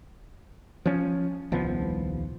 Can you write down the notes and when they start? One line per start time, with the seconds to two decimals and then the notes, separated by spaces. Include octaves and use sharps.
0.86 F3 C#4
1.52 D#1 C2 F3 B3